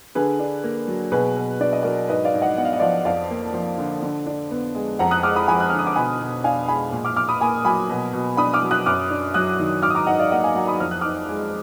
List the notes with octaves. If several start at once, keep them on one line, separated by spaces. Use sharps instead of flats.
D3 G#4 B4
D4
A#3
F#3
B2 G#4 B4
B2
D4 D5
D#5
F#3 A#4 D5
G#2 B4 D#5
D5 F5
G#2
D#5 F#5
B3 F#5
F5
D#5
F3 D5 F5
F2 D5 F5
A#3
F3
D3
D3
D4
B3
G#3
F2 F#5 A#5
D#6 F#6
G#3 D6 F6
B5 D#6
F3 G#5 B5
F#6
D3 F6
D#6
D6
B2 G#5 B5
B2
D4 F5 G#5
G#3 G#5 B5
A#2
D6 F6
A#2 D6 F6
B5 D#6
A#3 G#5 B5
F#3 G#5 B5
B2
B2
D4 B5 D#6
D6 F6
F#3
D#6 F#6
F#2 D6 F6
D4
F#3 D#6 F#6
D#3
G#2 D6 F6
D#6
A#5 D6
G#2 D#5 F#5
D5 F5
A#3 D#5 F#5
F5 G#5
F#3 F#5 A#5
B5 D#6
F2 F6
F#6
D#4 D6 F6
G#3